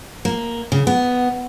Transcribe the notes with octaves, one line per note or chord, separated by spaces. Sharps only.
A#3
C#3
B3